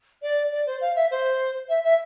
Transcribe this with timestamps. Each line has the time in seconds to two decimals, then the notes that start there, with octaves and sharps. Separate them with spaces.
0.22 D5
0.51 D5
0.66 C5
0.81 F5
0.95 E5
1.11 C5
1.69 E5
1.84 E5